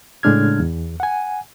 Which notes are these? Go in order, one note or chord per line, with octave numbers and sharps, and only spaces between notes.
A2 C#3 G#3 D4 F6 G#6
E2
F#5 G#5